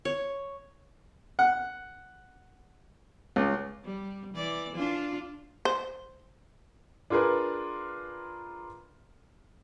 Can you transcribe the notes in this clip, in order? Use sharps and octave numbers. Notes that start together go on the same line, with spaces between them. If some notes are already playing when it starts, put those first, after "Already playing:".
C#5
F#5
C#2
G3
E3 D5
D4 F4
C5
D4 F4 G#4 A#4 B4